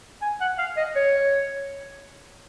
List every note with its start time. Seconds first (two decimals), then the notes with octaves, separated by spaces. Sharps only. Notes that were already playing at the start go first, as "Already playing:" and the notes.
0.22 G#5
0.41 F#5
0.59 F5
0.77 D#5
0.96 C#5